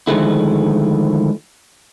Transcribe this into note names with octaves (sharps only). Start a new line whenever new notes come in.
D3 D#3 F3 G#3 A3 E4